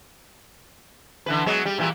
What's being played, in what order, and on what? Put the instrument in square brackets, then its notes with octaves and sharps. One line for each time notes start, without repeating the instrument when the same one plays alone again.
[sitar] D3 E3 B4
F#3 G#3 B3
G3
A#2 E3 G3